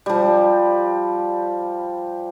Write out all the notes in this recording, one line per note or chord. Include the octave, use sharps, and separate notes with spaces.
F3 G3